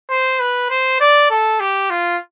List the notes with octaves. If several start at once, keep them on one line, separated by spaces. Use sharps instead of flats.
C5
B4
C5
D5
A4
G4
F4